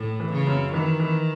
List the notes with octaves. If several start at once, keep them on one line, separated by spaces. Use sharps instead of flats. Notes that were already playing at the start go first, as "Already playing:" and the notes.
Already playing: A2
E3
C#3
F#2
D#3 E3
E3